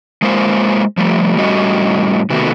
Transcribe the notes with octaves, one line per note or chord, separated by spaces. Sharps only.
G#3 A#3 F4 C5
F3 G3 A3
A2 G3 C#4 F#4 D#5
C3 D#3 A3 B3 F#4